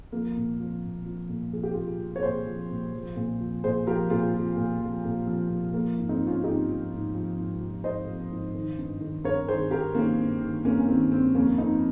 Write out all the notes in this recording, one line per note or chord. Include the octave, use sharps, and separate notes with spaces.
F3 A#3
A#2
F3
A#2
F3
A#2
F3 G#4
G4
A#2 F4 G#4
F3
C#5
A#2 G#4 C5
F3
A#2
F3
A#2
F3
A#2 G#4 C5
F3 G4 A#4
A#2 F4 G#4
F3
A#2
F3
A#2
F3
A#2
F3 A#3
G#2
C4 D#4
F3
C#4 F4
G#2 D#4 G4
F3
G#2
F3
G#2
F3
G#2 C5 D#5
F3
G#2
D#3
G2
D#3
G2 A#4 C#5
D#3 G#4 C5
G2 G4 A#4
D#3 A#3 C#4
G2
D#3
G2 A#3 C#4
C#4
D#3 C4
G2 C4
F2 A#3 C#4
F3 C4 D#4